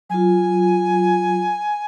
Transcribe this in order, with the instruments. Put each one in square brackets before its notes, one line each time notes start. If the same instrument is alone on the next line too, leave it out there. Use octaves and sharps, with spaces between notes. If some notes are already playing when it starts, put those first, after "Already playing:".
[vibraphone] F#3 F4 [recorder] G#5